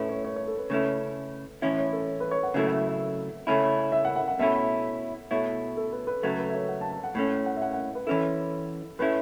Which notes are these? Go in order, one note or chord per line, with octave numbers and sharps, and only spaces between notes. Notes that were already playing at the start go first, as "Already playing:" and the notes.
Already playing: A2 A3 C#4 E4 B4
C#5
C#5
C#5
A4
B4
C#3 A3 C#4 E4
A2 E3 C#4 E4 C#5
C#5
A4
B4
C#5
F#5
C#3 F#3 A3 E4 E5
E5
E5
C#3 A3 C#4 E4
E5
F#5
F#5
F#5
B2 A3 C#4 E4 E5
B2 A3 E4 C#5
A4
B4
B4
C#3 F#3 A3 A4
B4
E5
C#5
F#5
A5
A5
F#5
A2 A3 C#4
F#5
E5
F#5
F#5
B4
E3 C#4 E4 A4
A2 A3 C#4 E4 B4